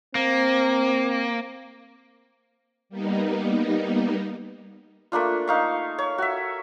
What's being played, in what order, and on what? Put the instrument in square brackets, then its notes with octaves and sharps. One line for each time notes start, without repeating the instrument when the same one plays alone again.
[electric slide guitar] A#3 [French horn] C4
[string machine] G3 A#3 B3 D#4
[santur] A3 A#3 D4 F4
D#4 F5 C#6
C#5
F#4 E5